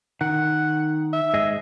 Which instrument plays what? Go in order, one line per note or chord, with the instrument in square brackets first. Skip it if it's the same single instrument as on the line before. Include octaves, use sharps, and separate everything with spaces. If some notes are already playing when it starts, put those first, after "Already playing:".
[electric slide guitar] D#3 [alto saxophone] F#5
[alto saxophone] E5
[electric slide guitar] G#2 G#4 D#5